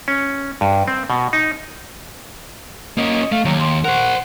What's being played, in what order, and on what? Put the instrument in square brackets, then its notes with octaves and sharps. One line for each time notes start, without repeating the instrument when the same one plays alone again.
[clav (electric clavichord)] C#4
G2
C4
B2
D#4
[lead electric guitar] A#3 C#4 [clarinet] D#5
[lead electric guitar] A3 [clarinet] F5
[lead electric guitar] D#2 [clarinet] F#3
[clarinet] C6
[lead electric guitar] A#4 C5 [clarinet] F#5